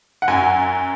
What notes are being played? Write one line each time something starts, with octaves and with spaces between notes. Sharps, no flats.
F#5
F#2 G#5